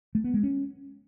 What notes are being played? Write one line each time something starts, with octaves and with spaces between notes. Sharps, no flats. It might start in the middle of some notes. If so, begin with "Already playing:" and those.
A3
B3
G#3
C#4